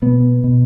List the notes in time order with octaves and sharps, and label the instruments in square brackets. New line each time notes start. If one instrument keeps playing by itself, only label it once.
[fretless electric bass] B2 B3
B2